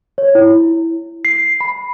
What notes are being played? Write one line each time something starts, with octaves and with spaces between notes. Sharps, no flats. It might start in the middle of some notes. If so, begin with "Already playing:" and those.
C#5
E4
C7
B5